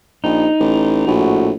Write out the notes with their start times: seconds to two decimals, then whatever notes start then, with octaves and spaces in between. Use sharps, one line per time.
0.24 A#1 D#4
0.60 A1
1.07 A#1 A2 F#4